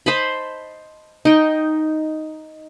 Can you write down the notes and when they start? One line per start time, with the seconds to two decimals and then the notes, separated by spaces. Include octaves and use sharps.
0.06 C5 D#5 A5 B5
1.25 D#4 G5